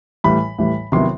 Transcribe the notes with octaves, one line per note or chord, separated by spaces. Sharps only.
A2 E3 G3 B5
A2 E3 G3
C3 D#3 F#3 B3 E4 C6